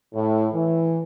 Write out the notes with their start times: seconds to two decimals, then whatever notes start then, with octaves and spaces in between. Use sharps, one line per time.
0.14 A2
0.53 E3